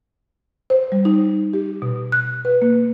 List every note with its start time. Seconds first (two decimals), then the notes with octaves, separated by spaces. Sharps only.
0.70 C5
0.92 G3
1.05 D#4
1.53 G4
1.82 B2
2.12 F#6
2.45 B4
2.62 A#3